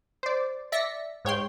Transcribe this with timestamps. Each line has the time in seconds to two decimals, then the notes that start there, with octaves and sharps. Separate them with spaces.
0.23 C5 D5
0.72 D5 E5 A#6 B6 C#7
1.25 G#2 C#5 G5 C6